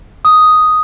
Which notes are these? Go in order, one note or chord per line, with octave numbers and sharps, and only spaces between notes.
D#6